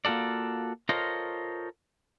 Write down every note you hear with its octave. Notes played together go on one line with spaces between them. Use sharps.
A#3 F4 F#4 A4 D5
F4 A4 A#4 C5 C#5 D#5